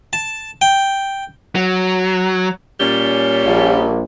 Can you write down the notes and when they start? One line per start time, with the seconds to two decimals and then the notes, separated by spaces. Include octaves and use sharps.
0.13 A5
0.62 G5
1.55 F#3
2.80 A#2 G3 C#4
3.45 A#1